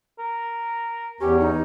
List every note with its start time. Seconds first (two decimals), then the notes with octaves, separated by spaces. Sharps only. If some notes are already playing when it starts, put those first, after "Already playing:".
0.19 A#4
1.21 E2 C#4 G4
1.40 D#4